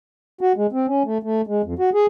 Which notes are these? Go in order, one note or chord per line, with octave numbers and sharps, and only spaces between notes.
F#4
G#3
C4
C#4
A3
A3
G#3
F2
F#4
G#4